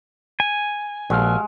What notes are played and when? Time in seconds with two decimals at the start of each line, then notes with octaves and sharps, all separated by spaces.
0.40 G#5
1.10 A#1 G#3 F#4 A4 F5